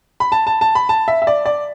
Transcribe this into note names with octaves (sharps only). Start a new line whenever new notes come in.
B5
A5
A5
A5
B5
A5
E5
E5
D5
D5